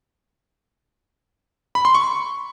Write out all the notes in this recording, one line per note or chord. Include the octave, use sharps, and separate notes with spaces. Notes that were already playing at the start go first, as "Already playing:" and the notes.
B5
C6
C#6